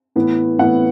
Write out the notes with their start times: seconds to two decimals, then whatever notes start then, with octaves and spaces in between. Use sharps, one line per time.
0.16 A2 E3 B3
0.59 A2 E3 B3 F#5